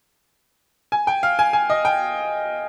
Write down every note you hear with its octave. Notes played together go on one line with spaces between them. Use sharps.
G#5
G5
F5
G#5
G#5
D#5
G5